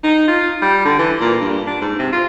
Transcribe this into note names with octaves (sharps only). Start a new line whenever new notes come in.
D#4
F4
G3
D3
E3
A#2
G2
D4
G#2
C3
F4